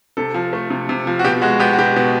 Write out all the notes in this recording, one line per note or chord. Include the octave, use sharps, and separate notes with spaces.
C3 A4
F3
A3
C3
C3
F3
F#4
B2 G4
G#3 F#4
B3 G4
F#4
B2 G4
B2